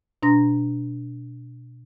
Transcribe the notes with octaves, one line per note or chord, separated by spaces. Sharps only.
B2 D4 A#5 C6 A#6